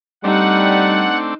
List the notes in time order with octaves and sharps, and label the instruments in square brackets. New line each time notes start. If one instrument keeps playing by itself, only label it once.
[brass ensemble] G3 [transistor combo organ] A3 C4 D4 [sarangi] D#4 [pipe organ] F#5